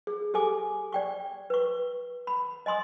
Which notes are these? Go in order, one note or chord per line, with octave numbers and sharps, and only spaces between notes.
G#4
G4 A4 G#5 D6
D5 G5 C#6
B4 C#6
B5
D#5 G#5 C6 D#6